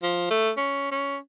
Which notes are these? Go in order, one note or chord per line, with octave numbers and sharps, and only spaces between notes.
F3
A3
C#4
C#4